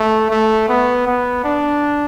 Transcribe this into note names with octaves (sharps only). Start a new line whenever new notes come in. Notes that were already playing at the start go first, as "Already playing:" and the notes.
Already playing: A3
A3
B3
B3
D4